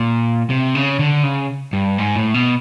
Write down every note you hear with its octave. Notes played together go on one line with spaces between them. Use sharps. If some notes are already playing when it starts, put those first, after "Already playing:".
Already playing: A#2
C3
C#3
D3
C#3
G2
G#2
A2
B2